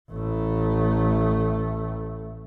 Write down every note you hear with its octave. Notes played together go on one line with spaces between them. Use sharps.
A1 A3